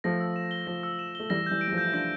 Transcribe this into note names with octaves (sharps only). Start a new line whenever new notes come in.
F3 A3 A#6
E6
E7
G7
F3 A#6
E6
E7
A3 G7
E3 G3 A#6
E3 G3 G6
D7
G3
F3 A3
G6
E4
D4 F4 A#6